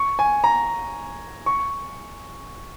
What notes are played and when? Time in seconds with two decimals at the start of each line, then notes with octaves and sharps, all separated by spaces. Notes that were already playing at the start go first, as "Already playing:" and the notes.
Already playing: C#6
0.19 G#5
0.44 A#5
1.46 C#6